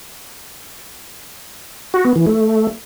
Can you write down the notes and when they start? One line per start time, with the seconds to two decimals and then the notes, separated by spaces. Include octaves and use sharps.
1.94 F#4
2.05 B3
2.16 E3
2.27 A3